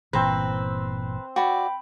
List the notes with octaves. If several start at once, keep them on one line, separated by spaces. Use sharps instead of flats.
G1 A#2 E3 C4 B4 C5 A#5
F#4 D5 G5 B5